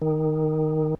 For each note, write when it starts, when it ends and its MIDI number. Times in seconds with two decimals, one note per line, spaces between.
0.02 0.95 51